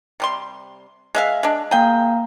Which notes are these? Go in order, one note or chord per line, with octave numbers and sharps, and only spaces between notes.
C3 G3 C6
G#3 E5 F5
G#3 D4
A#3 G#4 F5 G5 A#5